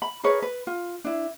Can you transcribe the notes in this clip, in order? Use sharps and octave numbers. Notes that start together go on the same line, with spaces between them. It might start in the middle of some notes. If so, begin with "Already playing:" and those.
B5
G#4 A#4 B4 C#5
B4
F4
D4 E4